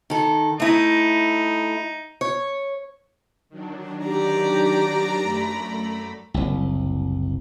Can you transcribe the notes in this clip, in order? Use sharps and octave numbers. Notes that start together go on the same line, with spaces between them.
D#3 A4
A3 D#4 E4
C#5
D#3 F#3 D4
G4 D5 A#5
F#2 A3 B5
F#1 C2